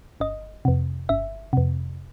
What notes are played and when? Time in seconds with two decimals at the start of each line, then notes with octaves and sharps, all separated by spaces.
0.20 G1 D#5
0.65 F2 C3
1.09 G1 E5
1.53 F2 C3